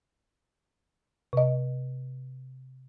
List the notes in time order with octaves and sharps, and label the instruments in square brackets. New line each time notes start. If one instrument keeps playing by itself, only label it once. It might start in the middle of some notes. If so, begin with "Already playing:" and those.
[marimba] C3 D#5